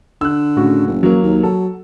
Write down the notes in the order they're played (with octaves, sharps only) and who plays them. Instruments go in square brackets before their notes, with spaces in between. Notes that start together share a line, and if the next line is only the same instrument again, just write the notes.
[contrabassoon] D3 [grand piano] E6 F#6
[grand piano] A2 C#3 F#4
[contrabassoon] F#1
[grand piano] F#3 A#3
[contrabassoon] D#2
[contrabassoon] F#3 [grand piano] A4